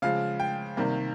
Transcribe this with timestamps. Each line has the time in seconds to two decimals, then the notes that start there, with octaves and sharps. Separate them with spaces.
0.02 C#3 F3 G#3 F5
0.40 G5
0.77 C3 D#3 G3 A#3